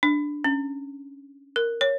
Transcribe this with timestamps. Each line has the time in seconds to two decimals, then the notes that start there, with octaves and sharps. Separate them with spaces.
0.03 D4
0.44 C#4
1.56 A#4
1.81 C#5